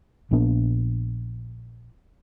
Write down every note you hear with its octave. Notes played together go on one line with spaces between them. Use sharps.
A#1 A#2 B3 D4